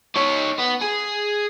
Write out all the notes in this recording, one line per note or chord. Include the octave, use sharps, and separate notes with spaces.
D#4 C#5
B3
G#4